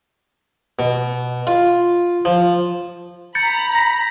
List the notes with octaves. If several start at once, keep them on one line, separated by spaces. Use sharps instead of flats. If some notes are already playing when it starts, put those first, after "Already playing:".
B2
F4
F3
A#5 B5 G6 A6 C#7
A#6 B6